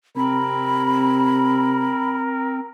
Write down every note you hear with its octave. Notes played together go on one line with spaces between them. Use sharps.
C3 C4 A#4 B5